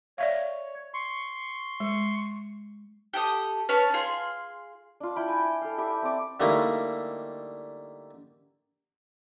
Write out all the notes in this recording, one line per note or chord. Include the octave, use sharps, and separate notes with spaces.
C#5 D5 E5 F5
C6 C#6
G#3
G4 A4 D#6
C#4 B4 C#5 A5
F4 G#4 C6
D4 F4
E4 G5 B5
G5 G#5
A4 F5
E4 G4 E5
C4 D5
D3 G3 A3 A#3 D#4 E4